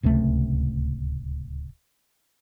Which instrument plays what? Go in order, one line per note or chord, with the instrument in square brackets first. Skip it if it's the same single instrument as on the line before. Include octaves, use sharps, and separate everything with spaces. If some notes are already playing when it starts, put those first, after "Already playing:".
[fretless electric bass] D1 C#2 C3 A3